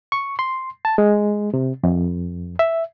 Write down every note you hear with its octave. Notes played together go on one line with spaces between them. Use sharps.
C#6
C6
A5
G#3
C3
F2
E5